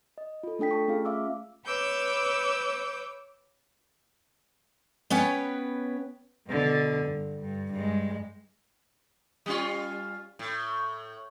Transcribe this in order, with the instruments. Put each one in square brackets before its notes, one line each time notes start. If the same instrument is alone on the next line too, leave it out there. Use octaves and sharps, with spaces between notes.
[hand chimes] D#5
F4 A4
A3 D4 A4 G5 B6
A5 C#6
A3 C#4 F4 G#4 F5
E5 F5 D6 E6
[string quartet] B4 C#5 D6 E6 G6
[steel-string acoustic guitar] B3 C#4 B4 C#5 G5
[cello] B2 D3
G2
G2
G2 G#3
[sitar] G3 C#4 F4
A2